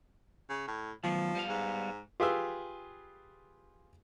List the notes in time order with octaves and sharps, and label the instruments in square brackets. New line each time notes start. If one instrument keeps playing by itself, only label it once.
[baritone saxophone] C#3
A2
[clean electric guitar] D#3 F#3 B3 [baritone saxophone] F3
[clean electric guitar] G3 B3 F5
[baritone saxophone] G#2
[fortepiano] F4 G4 G#4 B4 G#5 E6